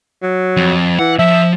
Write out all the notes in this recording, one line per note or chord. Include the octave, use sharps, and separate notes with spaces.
F#3
F2
E3 F#5
F3 E5